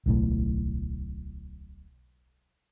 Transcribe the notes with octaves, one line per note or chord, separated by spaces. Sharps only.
D1 B1 A2